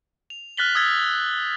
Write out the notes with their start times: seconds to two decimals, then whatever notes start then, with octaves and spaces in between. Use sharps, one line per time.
0.30 F7
0.57 F6 F#6 A6 B6 F#7 G7
0.75 D#6 E6 G#6 A6 B6